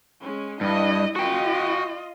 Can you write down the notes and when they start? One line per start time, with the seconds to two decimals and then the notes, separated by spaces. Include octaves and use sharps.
0.21 G#3 C#4
0.61 G2 E4 D#5
1.16 F4 F#4 D#5 G5